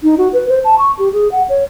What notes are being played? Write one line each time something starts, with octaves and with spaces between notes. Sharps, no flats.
D#4
F#4
B4
C5
A5
C#6
G4
G#4
F#5
C#5